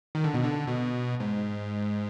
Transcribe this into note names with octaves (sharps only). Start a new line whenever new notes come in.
D#3
D3
B2
D3
B2
G#2